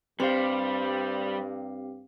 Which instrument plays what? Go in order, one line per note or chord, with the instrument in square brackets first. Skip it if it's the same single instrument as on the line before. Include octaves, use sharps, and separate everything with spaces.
[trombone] G2 [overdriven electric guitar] G3 [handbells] C4 G4 F5 [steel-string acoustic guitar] C5